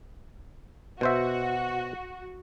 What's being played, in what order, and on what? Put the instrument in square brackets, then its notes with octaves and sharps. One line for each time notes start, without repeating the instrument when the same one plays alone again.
[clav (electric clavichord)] B2 C5 E5 [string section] F#4